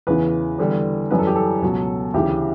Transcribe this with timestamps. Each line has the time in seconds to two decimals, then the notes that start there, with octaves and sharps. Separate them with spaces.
0.07 E2 C#3 E3 B4
0.59 E2 D3 G3
1.11 F#2 E3 G3 B4
1.19 A4
1.27 G4
1.36 A4
1.62 C#2 B2 F#3
2.14 D2 C#3 E3 G4